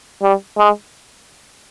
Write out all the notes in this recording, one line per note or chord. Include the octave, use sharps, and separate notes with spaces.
G3
G#3